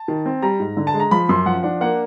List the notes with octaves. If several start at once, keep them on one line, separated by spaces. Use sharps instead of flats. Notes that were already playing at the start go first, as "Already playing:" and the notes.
Already playing: A5
D#3
C4
G3 A#5
G#2
D3
A5
G#3
A#5
F3 B5
F#2 C6
F3 F#5
D4 F#5
A#3 F#5